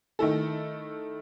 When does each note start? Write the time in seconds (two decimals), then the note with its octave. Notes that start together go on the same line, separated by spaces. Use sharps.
0.19 D#3 A3 E4 A4